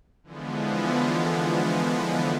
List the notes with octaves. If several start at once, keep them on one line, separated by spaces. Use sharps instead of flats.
D3 E3 F3 G#3 B3